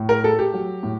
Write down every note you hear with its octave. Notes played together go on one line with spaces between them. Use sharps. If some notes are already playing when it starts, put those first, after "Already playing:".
Already playing: A2
A#4
A3 A4
G4
F#3
A2